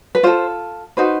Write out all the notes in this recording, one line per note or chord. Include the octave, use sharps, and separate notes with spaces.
B4
F4 A4 C5
D#4 F#4 B4 C5